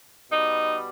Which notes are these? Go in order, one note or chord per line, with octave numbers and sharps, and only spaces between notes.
B2 G3 D#4